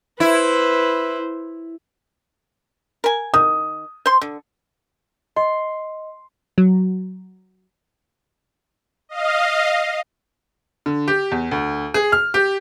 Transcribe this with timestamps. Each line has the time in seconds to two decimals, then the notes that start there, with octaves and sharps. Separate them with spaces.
0.20 E4 B4 C5
3.04 A#4 G#5
3.34 D#3 D#6
4.06 C5 C6
4.22 D3
5.36 D#5 C6
6.58 F#3
9.09 D#5 F5
10.86 D3
11.08 G4
11.31 E2
11.51 D2
11.94 G#4
12.12 F6
12.34 G4